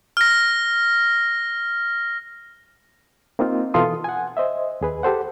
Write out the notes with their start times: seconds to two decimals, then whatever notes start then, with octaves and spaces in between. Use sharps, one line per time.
0.17 F6 A#6
3.39 A#3 C4 D#4 F4
3.74 B2 E3 F4 A4 C6 D#6
4.04 F#5 G#5
4.37 C5 D#5 E5
4.81 D#2 G#4 B4
5.03 G4 A4 C5 F#5